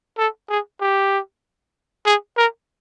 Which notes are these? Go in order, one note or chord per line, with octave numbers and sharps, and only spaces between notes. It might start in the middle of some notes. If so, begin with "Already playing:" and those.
A4
G#4
G4
G#4
A#4